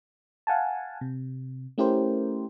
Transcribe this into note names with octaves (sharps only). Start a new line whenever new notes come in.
F5 F#5 G#5 A5
C3
A3 C#4 E4 G4 A#4 C5